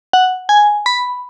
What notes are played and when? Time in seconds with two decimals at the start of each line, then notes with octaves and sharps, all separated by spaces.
0.13 F#5
0.49 G#5
0.86 B5